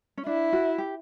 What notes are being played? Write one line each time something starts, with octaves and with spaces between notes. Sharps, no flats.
C#4
D4 E4
F#4
G4